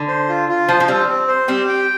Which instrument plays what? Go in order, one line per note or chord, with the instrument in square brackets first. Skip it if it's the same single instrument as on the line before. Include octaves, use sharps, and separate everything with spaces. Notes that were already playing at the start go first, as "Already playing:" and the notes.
Already playing: [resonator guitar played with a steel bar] D3
[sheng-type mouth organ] C5
F4
F4
[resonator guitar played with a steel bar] F3 [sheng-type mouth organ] C5
[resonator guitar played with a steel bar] F3
[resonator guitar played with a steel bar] G3 [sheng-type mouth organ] C4
[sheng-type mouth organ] C4
C5
[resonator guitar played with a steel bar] G3 C4 [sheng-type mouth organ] G4
[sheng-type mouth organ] G5